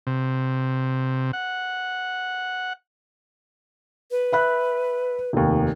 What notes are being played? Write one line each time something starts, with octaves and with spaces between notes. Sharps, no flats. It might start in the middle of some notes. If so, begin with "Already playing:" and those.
C3
F#5
B4
E5 B5 F#6
F1 D#2